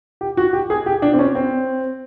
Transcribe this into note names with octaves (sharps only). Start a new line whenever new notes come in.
G4
F#4
G4
G#4
G4
D4
C4
C#4
C4